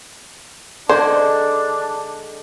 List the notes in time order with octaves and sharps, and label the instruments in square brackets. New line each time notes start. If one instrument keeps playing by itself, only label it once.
[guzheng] D3 G#3 D#4 [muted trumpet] D4 [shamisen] C5 [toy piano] D5